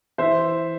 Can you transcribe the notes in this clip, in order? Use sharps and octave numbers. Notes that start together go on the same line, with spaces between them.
E3 C5 E5